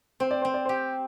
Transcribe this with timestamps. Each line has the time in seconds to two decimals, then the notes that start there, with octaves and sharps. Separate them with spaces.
0.20 C4 C5
0.31 D5
0.42 C4 C5
0.54 D5
0.65 G4 C5